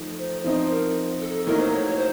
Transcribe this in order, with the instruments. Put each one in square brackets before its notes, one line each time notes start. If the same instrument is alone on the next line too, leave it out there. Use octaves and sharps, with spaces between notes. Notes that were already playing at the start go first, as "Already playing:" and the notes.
Already playing: [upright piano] F3 A3 D#4
[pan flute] C5
[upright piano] F3 C4 D#4 [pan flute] C5
[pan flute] A#4
A4
[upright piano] A2 F#3 A#3 D#4 [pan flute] A#4
[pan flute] C5
C#5
C#5
C5